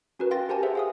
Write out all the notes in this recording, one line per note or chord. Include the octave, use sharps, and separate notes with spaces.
C#4 F#4 A#4 B4
F5 G5 C6 A6 A#6
G4 A#4 C5 G#5 A5
G#4 C5 E5 F#5
G#4 F5 D#6